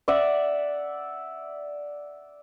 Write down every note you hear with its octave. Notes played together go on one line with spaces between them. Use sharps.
D5 E5 F#5